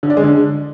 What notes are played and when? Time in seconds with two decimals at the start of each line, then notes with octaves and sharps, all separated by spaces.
0.03 D3
0.10 D4
0.17 G#3
0.24 D3